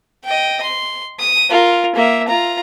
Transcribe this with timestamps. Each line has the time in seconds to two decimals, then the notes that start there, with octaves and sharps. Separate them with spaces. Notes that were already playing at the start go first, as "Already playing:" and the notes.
0.25 D#5 G5
0.63 C6
1.19 D#6
1.50 F4 A#4
1.95 A#3 E5
2.28 F4 A#5